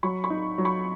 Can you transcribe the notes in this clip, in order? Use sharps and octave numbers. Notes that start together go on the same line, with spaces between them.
F#3 B5 C#6
B5 C#6
D#4
F#3
B5 C#6